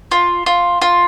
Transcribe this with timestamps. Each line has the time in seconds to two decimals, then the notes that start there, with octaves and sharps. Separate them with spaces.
0.11 F4
0.46 F4
0.82 F4